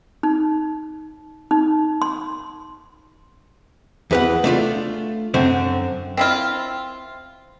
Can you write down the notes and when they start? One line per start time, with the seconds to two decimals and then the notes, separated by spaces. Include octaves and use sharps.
0.23 D#4
1.51 D#4
2.02 C6
4.11 E2 B4 F#5
4.44 A3 D4 F4
5.34 F#2 D3 C4
6.17 C4 E4 F4